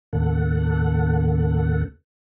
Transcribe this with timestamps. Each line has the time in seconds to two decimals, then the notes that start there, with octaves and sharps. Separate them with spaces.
0.13 D#2 A2 C#3 A#3 A4 F#5